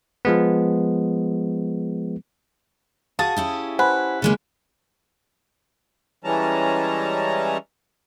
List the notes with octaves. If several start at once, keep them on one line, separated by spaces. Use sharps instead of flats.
F3 G#3 B3
F#4 G#4 F5 A5 D#6
C#4 E4 G4
B4 C5 F#5 G#5
C#3 G#3 A#3
E3 G3 G#3 C#4 A5 A#5